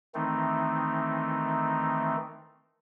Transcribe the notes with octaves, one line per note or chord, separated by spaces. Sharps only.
D#3 E3 A3 C4 D#4